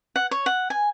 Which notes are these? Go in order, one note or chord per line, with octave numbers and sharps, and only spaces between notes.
F#5
C#5
F#5
G#5